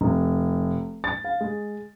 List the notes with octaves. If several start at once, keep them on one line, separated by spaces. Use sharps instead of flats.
F1
A6
F5
G#3